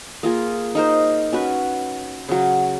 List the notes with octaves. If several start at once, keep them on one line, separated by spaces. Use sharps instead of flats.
A#3 F4 G#4
D#4 A#4 C5
C#4 F#4 B4
C#3 F#3